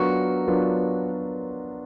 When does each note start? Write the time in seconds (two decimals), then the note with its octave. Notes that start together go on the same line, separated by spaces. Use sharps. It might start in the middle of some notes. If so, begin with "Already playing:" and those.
Already playing: F#3 B3 D4 F4 F#4 A#4
0.47 F#3 B3 D4 F4 A#4